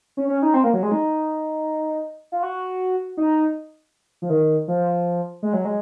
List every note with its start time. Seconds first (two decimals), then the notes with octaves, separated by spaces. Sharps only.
0.17 C#4
0.29 C#4
0.42 D#4
0.54 C4
0.64 A#3
0.73 F#3
0.83 G#3
0.92 D#4
2.32 F4
2.43 F#4
3.17 D#4
4.22 F3
4.30 D#3
4.68 F3
5.43 G#3
5.53 F#3
5.65 G#3